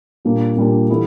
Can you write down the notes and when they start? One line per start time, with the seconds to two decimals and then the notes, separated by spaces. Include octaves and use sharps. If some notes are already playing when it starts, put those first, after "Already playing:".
0.25 A#2 G3 A#3 D4
0.57 A#2 G3 A#3 D4
0.89 E3 G3 B3 E4 A4